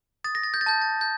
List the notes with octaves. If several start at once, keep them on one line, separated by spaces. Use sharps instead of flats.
D#6 A6
A#6
A6
G6
A6
A5 G6
A6
G6